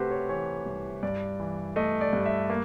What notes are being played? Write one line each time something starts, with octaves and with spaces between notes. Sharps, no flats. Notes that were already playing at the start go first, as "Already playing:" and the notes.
Already playing: C3 A3 F#4 G4 B4 C5
C#5
E3 C#5
C2
G2 D5
E3
A3 D#5
D5
G2
E5
A#3